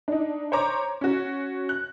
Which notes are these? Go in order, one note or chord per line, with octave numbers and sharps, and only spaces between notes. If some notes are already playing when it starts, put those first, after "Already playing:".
D4 D#4
C5 C#5 A#5 D6
C#4 F#4
F#6